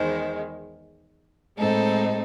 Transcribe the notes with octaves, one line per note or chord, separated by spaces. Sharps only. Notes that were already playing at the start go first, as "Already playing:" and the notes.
Already playing: E2 D#3 G#3 C5
A2 G#3 C4 D#4 A4